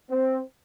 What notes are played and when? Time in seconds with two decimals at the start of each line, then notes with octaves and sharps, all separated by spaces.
0.10 C4